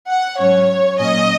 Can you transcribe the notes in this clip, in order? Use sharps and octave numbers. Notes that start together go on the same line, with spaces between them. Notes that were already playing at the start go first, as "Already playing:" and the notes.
F#5
G#2 F#3 C#4 C#5
A#2 F#3 C#4 D#5